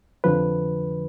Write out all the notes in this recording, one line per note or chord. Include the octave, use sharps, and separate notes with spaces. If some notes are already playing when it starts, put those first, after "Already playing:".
F2 D3 F3 B4